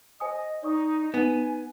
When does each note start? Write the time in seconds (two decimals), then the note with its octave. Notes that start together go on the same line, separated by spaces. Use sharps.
0.20 C5 D#5 G#5 D#6
0.63 D#4 D5 C#6 D#6
1.14 B3 D#4 G#5